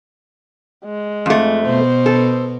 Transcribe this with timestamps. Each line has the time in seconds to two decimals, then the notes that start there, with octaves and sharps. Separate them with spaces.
0.85 G#3
1.26 F2 A3
1.66 B2 B3 C5
2.06 A4